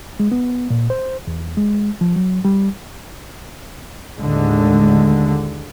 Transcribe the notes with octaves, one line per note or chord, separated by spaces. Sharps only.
G#3
B3
A#2
C5
E2
G#3
F3
F#3
G3
D#2 A2 D3 G#3